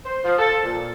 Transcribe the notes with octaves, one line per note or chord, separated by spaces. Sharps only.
C5
F3
A4
A#2